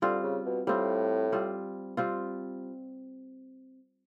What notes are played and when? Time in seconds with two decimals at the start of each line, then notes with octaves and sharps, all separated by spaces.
0.02 D3 G3 C4 F4
0.23 C#3
0.46 B2
0.67 A2 G3 C4 F4
1.32 G3 C4 F4
1.97 G3 C4 F4